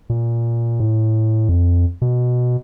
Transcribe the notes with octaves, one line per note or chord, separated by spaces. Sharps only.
A#2
A2
F2
B2